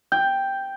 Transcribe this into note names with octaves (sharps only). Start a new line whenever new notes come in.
G5